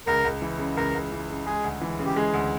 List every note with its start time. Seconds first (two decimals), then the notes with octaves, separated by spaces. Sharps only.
0.07 C#2 A#4
0.25 C#2
0.42 E3
0.59 C#3
0.77 C#2 A#4
0.95 C#2
1.12 E3
1.29 C#3
1.46 G#3 G#4
1.64 D2
1.81 E3
1.99 C#3
2.05 G4
2.16 G#3 G#4
2.34 D2